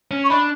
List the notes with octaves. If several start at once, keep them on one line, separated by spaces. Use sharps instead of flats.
C#4
C#6
D4 B5